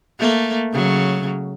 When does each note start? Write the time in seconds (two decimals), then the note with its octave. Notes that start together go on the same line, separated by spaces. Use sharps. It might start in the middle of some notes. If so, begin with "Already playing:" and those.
0.19 A3 A#3
0.72 C#3 F#3